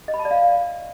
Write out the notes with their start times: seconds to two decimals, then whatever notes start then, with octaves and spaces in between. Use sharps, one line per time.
0.08 D#5
0.14 B5
0.19 A5
0.25 D5
0.31 F5